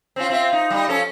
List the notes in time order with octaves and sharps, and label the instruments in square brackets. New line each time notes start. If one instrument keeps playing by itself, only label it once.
[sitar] C4 C#4 F4
C4 F4 E5
D#4
G3 D#4
F3 C#4 A4